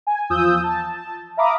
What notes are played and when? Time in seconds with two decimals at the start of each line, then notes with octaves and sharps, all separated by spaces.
0.07 G#5
0.30 E2 F3 F4 D#6 E6 G6
0.64 A5
1.37 E5 F5 A#5 B5 D6 D#6